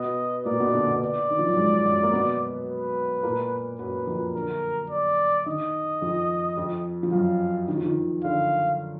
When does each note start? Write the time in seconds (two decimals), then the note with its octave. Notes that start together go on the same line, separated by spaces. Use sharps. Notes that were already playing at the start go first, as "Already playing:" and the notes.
Already playing: B2 B3 D#5
0.45 A#2 A#3 D5
0.60 B2 B3
0.73 D3 D4
0.87 B2 B3
1.02 D5
1.31 D#3
1.39 F3
1.48 F#3
1.57 G#2 G#3
1.85 F#2 F#3
2.03 A#3
2.13 B2 B3
2.68 B4
3.23 A#2 A#3
3.79 F#2 F#3 B4
4.07 F2 F3
4.35 D3 A#4
4.90 D5
5.46 D#3 D#5
6.02 F2 F3
6.57 F2 F3
7.03 F3
7.12 F#2 F#3 F5
7.68 D#3
7.77 F3
7.86 D#3
8.24 D3 F5